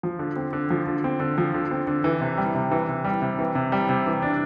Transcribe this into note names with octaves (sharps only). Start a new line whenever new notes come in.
F3
D3
C4
D3
F3
D3
C4
D3
F3
D3
C4
D3
E3
C3
G3
C3
E3
C3
G3
C3
E3
C3
G3
C3
E3
D4